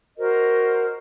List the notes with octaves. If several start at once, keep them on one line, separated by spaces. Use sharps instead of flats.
F#4 A#4 C5 D#5